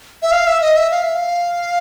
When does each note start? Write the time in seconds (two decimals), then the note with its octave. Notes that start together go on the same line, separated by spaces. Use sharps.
0.22 E5
0.32 F5
0.47 E5
0.62 D#5
0.77 E5
0.91 F5
1.03 E5
1.15 F5